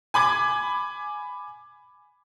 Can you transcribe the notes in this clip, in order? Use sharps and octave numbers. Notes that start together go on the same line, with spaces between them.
G#5 B5 D6 G#6